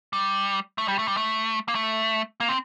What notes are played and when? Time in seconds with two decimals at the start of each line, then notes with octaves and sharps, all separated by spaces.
0.13 G3
0.78 A3
0.88 G3
0.99 A3
1.08 G3
1.17 A3
1.68 A#3
1.75 A3
2.40 A#3
2.49 C4